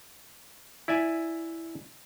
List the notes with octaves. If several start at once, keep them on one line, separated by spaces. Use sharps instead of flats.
E4 D5 E5 G#5